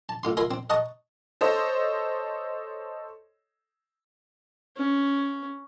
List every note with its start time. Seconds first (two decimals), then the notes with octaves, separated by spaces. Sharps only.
0.09 A5
0.23 A2 F4 C6
0.37 F4 A#4 E5 G#5 B5 C6
0.51 C4
0.70 D#5 F#5 A5 A#5 C#6 D#6
1.41 A4 C5 C#5 D#5
4.77 C#4